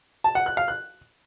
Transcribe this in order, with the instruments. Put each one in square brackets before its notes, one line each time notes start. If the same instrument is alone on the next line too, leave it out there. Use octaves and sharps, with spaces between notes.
[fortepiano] A5
F#5
F#6
F5
F#6